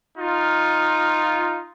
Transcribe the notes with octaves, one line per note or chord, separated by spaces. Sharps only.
D#4 F4